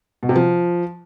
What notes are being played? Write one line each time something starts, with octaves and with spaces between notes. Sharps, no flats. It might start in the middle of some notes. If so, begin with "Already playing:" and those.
B2
C3
F3